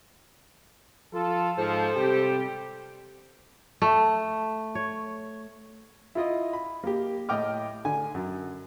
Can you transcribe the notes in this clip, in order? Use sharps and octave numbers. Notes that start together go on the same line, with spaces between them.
F3 F4 A4
G#2 F3 A4 C5
C3 G3 G4
A3
C#5
E4 F4 D#5
B5
A#3 G4
A2 D#5 G5 D6 F6
D3 G#5
F#2